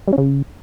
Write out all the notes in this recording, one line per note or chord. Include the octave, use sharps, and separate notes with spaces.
G3
C#4
C#3